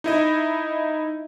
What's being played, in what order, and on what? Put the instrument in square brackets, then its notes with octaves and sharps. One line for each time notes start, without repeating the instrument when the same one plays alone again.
[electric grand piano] D#4 E4 D#5